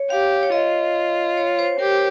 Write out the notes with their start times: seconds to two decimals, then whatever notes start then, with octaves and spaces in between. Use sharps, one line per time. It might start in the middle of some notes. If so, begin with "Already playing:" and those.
Already playing: C#5
0.10 G4 F5
0.43 C#5
0.52 F4 D#5
1.37 C#5
1.59 C5
1.79 G4 A#4